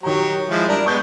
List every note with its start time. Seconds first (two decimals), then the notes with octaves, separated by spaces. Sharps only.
0.03 D#3 F#3 G4 C#5 A#5
0.50 F3 G#3 E4
0.68 G3 D4 A#4
0.86 G#3 B3 C#6 G6